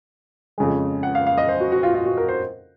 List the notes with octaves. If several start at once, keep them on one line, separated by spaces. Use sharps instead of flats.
F2 C#3 G#3
F#5
F5
F5
D#5
C5
F#4
F#4
F4
F4
F#4
A#4
C5